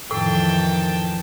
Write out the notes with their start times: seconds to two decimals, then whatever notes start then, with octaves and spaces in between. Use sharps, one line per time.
0.11 F2 A2 D#3 E3 G5 A5